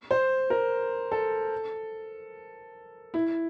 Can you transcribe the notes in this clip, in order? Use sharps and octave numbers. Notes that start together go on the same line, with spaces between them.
C5
A#4
A4
E4